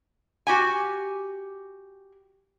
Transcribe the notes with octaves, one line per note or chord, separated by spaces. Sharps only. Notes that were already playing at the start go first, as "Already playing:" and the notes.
F#4 G4 G#5